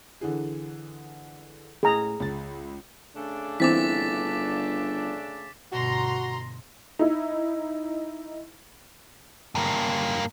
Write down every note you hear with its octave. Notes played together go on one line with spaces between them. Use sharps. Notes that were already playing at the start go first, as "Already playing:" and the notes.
D3 E3 G#4
A2 G#4 A#5
C#2 A6
C#3 A3 D4
G1 E3 C4 D6 A6 B6
G1 B2 F#4 A#5 C6
D#4 E4
G2 A#3